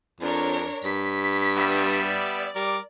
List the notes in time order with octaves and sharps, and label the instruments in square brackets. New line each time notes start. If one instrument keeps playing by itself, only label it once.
[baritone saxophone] F2 [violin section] D4 A#4 C#5
[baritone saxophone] G2 [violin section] B6
[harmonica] G3 B3 E5
[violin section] D5
[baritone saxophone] G3 [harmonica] A#4 D6